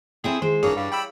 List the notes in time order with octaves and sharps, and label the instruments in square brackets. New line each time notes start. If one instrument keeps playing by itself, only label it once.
[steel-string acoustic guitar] C4 E4 A4 [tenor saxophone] G#4 [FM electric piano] G5 G#5
[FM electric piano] D#3 [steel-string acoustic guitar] G#3 [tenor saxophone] C5
[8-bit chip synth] G#1 G2 G#4 [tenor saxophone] A#3 [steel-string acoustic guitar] C#5 [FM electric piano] C7
[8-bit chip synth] G2 [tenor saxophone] G3 [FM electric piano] F5
[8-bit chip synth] G5 B5 E6